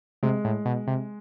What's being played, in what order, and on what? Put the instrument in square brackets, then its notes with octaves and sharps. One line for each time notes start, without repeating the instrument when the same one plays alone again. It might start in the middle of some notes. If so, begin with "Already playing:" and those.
[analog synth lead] C3 [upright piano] G#3
[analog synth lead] A2
B2
C3